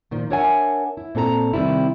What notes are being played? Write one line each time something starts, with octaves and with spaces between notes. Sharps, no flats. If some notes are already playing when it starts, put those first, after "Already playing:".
A#2 D#3 F3
D4 A#4 C#5 E5 F#5 G#5
E4
A#2 C4 A4 A#4 A#5
C3 D#3 F#3 G3 C4 E4